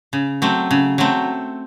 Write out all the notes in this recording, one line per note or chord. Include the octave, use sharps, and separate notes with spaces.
C#3
F#3 A3 C4
C#3
F#3 A3 C4